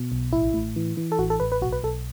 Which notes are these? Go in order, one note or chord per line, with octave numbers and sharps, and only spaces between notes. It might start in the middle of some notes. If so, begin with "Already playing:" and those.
Already playing: B2
B1
A1 E4
A2
E3
E3
A4
A1 F#4
A4
A1 B4
B4
B1 F#4
B4
B1 A4